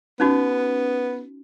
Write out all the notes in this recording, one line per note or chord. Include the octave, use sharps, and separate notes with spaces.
B3 C#4 D#4 F#4